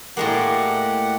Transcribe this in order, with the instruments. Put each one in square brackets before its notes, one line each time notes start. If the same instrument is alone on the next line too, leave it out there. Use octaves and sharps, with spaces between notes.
[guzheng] A2 G#3 A#3 [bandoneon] G4 F#5